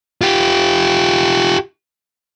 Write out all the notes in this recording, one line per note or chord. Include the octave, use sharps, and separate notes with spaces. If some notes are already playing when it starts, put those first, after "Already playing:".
F4 G4